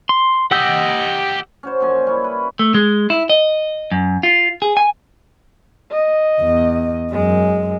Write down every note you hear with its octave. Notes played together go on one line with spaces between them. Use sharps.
C6
G4 D#5 F#5 E6 G6
C#4 F#4 C5
F#2 A#2 F3 G#5
G3 C#4 E4
B4
A3
G#3
E4
D#5
F#2
F4
G#4
G#5
D#5
E2
F#2 G#3